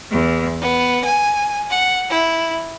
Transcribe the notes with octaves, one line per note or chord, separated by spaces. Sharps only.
E2
B3
G#5
F#5
E4